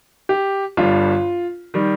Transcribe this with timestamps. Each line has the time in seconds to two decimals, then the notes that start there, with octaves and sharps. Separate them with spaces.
0.29 G4
0.77 G1 G2 G3 F4
1.74 D#3 G3